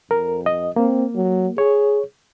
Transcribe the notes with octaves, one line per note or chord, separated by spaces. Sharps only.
F2 A#4
D#5
A#3 C4
F#3
G#4 C#5